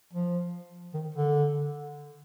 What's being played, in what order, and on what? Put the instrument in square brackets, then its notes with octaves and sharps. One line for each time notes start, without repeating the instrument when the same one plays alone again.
[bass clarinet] F3
D#3
D3